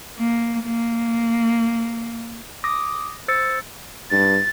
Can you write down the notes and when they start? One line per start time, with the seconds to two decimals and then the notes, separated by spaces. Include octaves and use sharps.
0.18 A#3
0.63 A#3
2.64 D6 D#6 A#6
3.28 C5 E6 A6 C#7
4.11 G2 A6